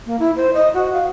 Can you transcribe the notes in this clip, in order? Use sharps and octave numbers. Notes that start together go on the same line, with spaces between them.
A#3
E4
C5
D#5
F#4
F5